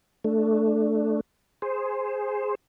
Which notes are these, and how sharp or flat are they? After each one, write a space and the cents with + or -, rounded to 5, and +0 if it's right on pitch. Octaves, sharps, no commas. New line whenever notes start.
A3 +0 D4 +10
G#4 +0 C5 +0